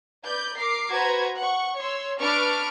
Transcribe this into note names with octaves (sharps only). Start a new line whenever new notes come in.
B4 D5 G6
A#4 D6 C7
F#4 B4 C5 A#5 G#6
F#5 C#6
C#5 C6 E6
D4 B4 C#6 F6 D7